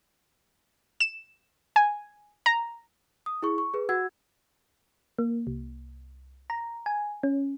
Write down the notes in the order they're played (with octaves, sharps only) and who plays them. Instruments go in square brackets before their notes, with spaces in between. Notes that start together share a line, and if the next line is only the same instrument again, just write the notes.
[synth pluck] E7
G#5
A#5
[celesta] D#6
E4 G#4 C#6
C#6
G#4 B4
F#4 F#5 E6 G#6
[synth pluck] A#3
C2
A#5
G#5
C#4